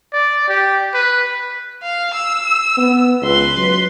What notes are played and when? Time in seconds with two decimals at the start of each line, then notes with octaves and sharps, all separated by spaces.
0.13 D5
0.48 G4
0.94 B4
1.82 F5
2.14 E6
2.77 B3
3.22 C#2 B4 C6
3.57 F#3